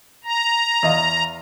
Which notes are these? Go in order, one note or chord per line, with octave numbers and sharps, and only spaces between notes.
A#5
E2 D#5 F5